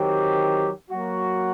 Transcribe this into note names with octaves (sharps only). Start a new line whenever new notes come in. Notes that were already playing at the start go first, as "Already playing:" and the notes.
Already playing: D#3 F#3 C4 G4
F#3 A#3 F#4